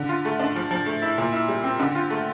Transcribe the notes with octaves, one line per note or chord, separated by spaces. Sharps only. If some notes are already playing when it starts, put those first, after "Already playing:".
Already playing: D3
F4
A3
D4
F3
F3
A3
E4
A#2
E4
G3
C4
D3
F4
A3